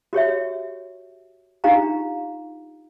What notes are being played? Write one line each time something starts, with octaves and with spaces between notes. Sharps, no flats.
F#4 G4 C#5 E5
D4 D#4 F4 G4 F5 A#5